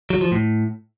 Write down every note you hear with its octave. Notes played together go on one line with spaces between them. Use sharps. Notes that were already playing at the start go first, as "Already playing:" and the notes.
F#3
F3
A2